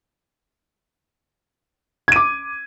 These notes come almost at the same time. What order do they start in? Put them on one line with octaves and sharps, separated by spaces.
G#6 D#7 D6